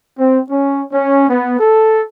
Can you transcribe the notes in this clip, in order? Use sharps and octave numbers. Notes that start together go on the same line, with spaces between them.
C4
C#4
C#4
B3
A4